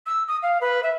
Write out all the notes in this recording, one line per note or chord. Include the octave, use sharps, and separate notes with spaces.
E6
D#6
F5
B4
E5